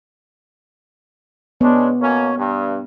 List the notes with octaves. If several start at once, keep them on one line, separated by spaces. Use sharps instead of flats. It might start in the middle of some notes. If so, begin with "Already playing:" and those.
G#3 B3 C#4 D4
B2 A#3 C#4
G2